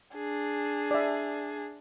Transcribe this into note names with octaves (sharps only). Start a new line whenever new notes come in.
D4 G#4
D5 E5